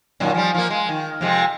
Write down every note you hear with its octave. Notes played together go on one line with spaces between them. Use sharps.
F#2 A#2 D#3
F3 G3
F3 A#3
G#3
D#3
F2 C3 G#3